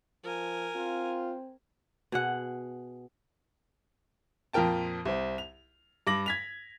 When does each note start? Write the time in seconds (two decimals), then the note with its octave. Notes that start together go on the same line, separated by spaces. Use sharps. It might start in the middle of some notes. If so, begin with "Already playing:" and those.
0.24 F3 A#4 G#5
0.76 C4 F4
2.12 B2 G#4 F#5
4.53 F2 A#2 F3 A#4 G5 A5
5.05 C2 C4
5.38 F7
6.07 G2 D6 A#6 F#7
6.26 G#6 B6 F7